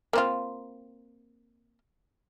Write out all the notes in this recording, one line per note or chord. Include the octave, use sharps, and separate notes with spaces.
A#3 C4 F4